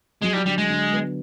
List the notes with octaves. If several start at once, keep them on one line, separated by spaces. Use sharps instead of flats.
F#3 G#3
G3
D3 G3
G#3
D3
B3